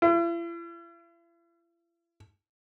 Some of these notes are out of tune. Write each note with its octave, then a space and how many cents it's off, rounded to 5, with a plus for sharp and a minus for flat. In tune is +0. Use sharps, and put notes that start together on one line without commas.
E4 +45